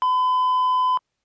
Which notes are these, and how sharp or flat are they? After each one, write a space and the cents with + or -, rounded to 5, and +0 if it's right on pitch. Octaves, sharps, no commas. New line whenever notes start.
B5 +40